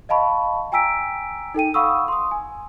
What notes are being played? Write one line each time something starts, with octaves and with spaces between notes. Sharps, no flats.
D#5 F5 A5 B5 C#6
G5 G#5 A#5 E6 B6 D7
D#4 A4 G5 D#7
F5 F#5 B5 C#6 D#6 E6
C6 D#6
G#5